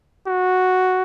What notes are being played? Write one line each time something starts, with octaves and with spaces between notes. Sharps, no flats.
F#4